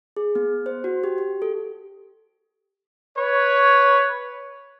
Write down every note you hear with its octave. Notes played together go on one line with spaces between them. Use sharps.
G#4
B3
C5
F#4
G4
G4
A4
B4 C#5